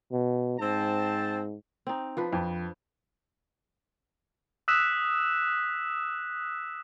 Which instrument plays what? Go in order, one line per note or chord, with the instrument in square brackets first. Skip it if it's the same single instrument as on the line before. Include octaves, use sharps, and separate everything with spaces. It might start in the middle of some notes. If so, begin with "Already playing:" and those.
[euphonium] B2
[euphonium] G#2 [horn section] C4 A5
[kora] C4 D#4
F3 D4 B4
[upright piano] F2
[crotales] D#6 E6 F#6 B6 E7